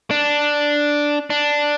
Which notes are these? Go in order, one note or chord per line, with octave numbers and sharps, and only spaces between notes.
D4
D4